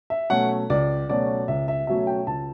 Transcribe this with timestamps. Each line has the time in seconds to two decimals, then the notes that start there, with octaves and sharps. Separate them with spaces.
0.10 E5
0.30 B2 F#3 A3 C#4 F#5
0.70 C#2 D5
1.09 B2 F#3 A3 C#4 D5
1.48 C#2 E5
1.68 E5
1.87 B2 F#3 A3 C#4 E5
2.07 G5
2.27 C#2 A5